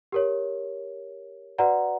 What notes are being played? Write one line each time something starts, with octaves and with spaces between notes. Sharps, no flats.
G4 A#4 C#5
F#4 B4 D5 F#5 A#5